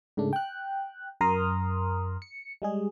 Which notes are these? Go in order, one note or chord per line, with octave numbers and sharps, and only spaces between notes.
G#2 C#3 A3 D4
G5 F#6
F#2 A#4 A#5 C6 D#6 F6
C#7
G3 G#3 G#4